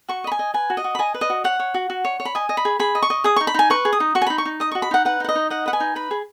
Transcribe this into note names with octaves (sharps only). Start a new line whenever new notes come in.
F#4 C#6
D#5 B5
G#5
D#5
B4 G#5
F#4
D#5
F#4
B5
D#5 G#5
B4
D#5
F#4
C#5 F#5
C#5
F#4
F#4
C#5
C#5
B5
D#5 G#5
D#5
B5
G#4
G#4 B5
D#5
C#6
D#5
G#4 D#6
D#4 C#6
B5
D#4 G#5
B4 C#6
G#4
D#6
D#4
F#4 C#6
G#5
D#4 B5
C#6
D#4
D#5 D#6
F#4 C#6
B5
D#4 F#5
B4 F#5
D#4 F#5
D#5
D#4
D#5 F#5
B4 F#5
G#5
D#4
B4 B5
G#4